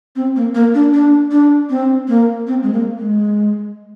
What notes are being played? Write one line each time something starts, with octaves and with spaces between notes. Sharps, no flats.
C4
A#3
A#3
D4
D4
D4
C4
A#3
C4
G#3
A#3
G#3